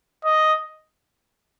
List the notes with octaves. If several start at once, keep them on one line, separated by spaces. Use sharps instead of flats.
D#5